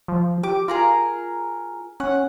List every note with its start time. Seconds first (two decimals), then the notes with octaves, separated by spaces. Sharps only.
0.08 F3
0.43 G4 D6
0.68 F4 G#4 A#4 A#5
2.00 C#4 F#5